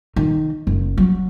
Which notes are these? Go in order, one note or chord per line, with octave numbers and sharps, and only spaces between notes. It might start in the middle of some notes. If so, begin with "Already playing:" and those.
D#3
F#1
F#3